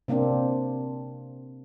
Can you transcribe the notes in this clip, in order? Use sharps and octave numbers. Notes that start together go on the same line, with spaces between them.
C3 A#3 C4 D4